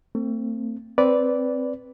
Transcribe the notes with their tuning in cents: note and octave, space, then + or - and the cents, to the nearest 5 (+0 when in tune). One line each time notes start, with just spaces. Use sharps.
A3 +40 C4 +0
C4 +0 B4 +0 D5 -15